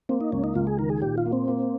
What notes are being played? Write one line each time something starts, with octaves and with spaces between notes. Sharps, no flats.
A#3 C4
D#4
C#2 C#4
D#4
C#2 F4
G#4
D#3 A#4
G#4
A#2 G4
F4
A#3
C4
A#3